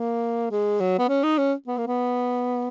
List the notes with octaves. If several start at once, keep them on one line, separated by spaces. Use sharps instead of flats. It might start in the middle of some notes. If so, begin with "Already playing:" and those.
Already playing: A#3
G#3
F#3
B3
C#4
D#4
C#4
B3
A#3
B3